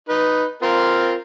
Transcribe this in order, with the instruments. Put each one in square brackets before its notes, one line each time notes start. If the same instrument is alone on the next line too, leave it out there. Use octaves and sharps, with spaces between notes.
[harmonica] D#4 B4
C4 F4 A#4